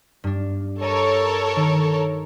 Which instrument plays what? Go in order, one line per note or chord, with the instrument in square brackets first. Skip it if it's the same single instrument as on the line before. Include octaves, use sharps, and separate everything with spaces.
[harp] G2 D4
[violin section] A4 A#4 C#5 [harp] D#5 A5
[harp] D#3